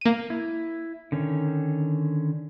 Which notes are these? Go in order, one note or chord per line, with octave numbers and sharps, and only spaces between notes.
A#3 D#7
E4
D3 D#3 C#4